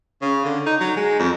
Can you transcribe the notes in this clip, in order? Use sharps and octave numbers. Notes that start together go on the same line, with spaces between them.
C#3
D3
D#4
F#3
G#3
F2